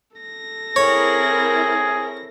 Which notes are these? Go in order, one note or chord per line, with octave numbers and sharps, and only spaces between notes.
A4 A#6
C4 E4 G#4 A#4 C#5